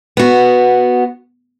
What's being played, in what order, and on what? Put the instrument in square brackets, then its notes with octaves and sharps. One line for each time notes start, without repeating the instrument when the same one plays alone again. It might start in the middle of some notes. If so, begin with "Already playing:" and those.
[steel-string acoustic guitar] B3 F#4